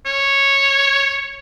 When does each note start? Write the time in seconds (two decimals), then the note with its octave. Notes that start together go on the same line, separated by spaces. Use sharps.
0.06 C#5